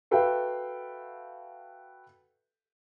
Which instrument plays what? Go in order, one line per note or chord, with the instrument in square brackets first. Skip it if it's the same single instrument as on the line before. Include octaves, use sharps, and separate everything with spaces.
[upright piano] F#4 A4 B4 E5 F5 G5